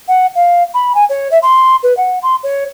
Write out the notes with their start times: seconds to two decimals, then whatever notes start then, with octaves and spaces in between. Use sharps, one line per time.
0.08 F#5
0.36 F5
0.74 B5
0.95 G#5
1.10 C#5
1.31 E5
1.43 C6
1.83 B4
1.97 F#5
2.23 C6
2.44 C#5